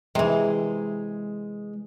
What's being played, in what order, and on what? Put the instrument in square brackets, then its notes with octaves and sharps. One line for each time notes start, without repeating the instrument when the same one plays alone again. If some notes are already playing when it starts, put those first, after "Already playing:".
[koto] C3 E3 [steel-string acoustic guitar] G#3